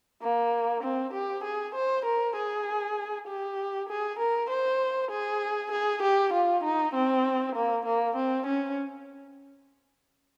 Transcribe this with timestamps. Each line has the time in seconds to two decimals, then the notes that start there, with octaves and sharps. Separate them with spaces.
0.22 A#3
0.83 C4
1.14 G4
1.44 G#4
1.75 C5
2.05 A#4
2.36 G#4
3.27 G4
3.89 G#4
4.19 A#4
4.50 C5
5.11 G#4
5.72 G#4
6.03 G4
6.33 F4
6.64 D#4
6.95 C4
7.56 A#3
7.86 A#3
8.16 C4
8.47 C#4